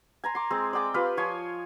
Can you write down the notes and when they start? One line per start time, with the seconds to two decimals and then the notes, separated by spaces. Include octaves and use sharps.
0.24 G#5 A#5 C6
0.35 C6 D6
0.51 G#3 C4
0.73 D5 D#5 G5 D6
0.94 F4 G4 B4 F5
1.17 F3 C#5 G#5 C6